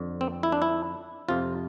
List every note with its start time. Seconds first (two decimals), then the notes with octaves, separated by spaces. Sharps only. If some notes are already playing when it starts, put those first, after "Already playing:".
Already playing: F2 D3
0.21 C4
0.43 E4
0.52 D4
0.62 E4
1.28 F2 C3 F3 F4